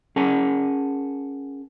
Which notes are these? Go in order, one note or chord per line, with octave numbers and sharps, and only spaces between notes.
C#4 G#4 A#4 F#5 G#5 A5